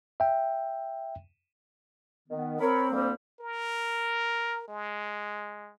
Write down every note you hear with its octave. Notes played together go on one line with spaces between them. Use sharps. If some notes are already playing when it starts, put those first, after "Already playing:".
E5 G5
D#3 B3
C4 A#4 C#5 B5
D2 G3 A#3
A#4
G#3